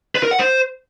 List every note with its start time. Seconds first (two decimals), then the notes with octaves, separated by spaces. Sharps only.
0.15 B4
0.23 A#4
0.31 F#5
0.39 C5